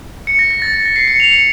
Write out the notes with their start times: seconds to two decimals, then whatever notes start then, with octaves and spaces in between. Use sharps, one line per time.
0.27 C#7
0.39 A#6
0.50 A#6
0.62 A6
0.74 A6
0.86 A#6
0.96 C7
1.08 C#7
1.20 F7
1.31 C#7